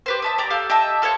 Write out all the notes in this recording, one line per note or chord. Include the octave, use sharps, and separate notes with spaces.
G4 B4 C5
E5 A5 D#6
G4 D5 A#5
G4 A4 F5
G4 D#5 E5 A5
F4 A4 C5 C#5